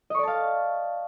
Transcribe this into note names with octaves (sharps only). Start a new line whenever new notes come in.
D5 D#5 F5 A5 C#6